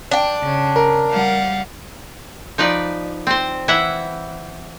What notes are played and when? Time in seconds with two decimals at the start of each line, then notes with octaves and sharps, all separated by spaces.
0.11 D4 G5
0.43 C#3
0.76 A#4
1.11 G3 F5 F#5
2.58 F3 D#4 B4 D5
3.27 C4 C5
3.68 E3 E4 E5 F#5